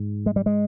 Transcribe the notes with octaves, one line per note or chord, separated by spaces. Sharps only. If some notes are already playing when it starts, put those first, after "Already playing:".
Already playing: G#2
G#3
G3
G#3